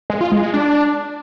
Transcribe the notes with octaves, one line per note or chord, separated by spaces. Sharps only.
G#3
F4
G#3
G#3
D4